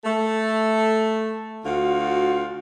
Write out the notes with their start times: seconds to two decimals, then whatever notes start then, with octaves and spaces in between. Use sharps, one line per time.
0.05 A3
1.65 D2 F4 F#4